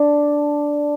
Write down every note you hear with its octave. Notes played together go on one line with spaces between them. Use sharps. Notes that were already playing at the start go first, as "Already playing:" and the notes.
Already playing: D4